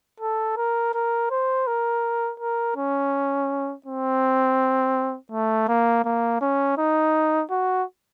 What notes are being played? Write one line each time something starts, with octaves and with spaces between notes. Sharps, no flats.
A4
A#4
A#4
C5
A#4
A#4
C#4
C4
A3
A#3
A#3
C#4
D#4
F#4